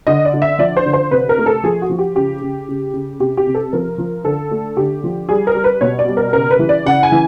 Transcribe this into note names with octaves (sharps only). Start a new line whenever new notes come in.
D3 D#5
D5
D3
E5
F3 D5
C5
D3
C5
C3 B4
A#4
A3
A4
F3 G#4
F#4
F3
G4
C#3 G4
C#3
C#3
C#3
C3 G4
G4
C3
A4
F3 A#4
F3
D3 A4
A3
D3 G4
F3
G3 G#4
A#4
G3
B4
B2 C#5
D5
G3
A#4
C#3 A#4
B4
E3
D5
C#3 F#5
G#5
E3